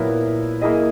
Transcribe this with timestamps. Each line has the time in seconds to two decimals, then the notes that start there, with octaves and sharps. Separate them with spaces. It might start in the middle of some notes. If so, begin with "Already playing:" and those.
Already playing: A#2 F#3 B3 E4 A#4
0.61 A#3 E4 G#4 D#5